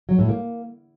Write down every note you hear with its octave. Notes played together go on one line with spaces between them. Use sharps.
F#3
A2
A#3